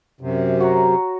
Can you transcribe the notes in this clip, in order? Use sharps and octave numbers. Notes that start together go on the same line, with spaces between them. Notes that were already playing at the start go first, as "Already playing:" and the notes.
F#2 C3
F#4 C#5 A#5